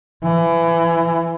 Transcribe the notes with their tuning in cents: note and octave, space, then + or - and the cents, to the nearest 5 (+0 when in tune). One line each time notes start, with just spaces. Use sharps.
E3 +25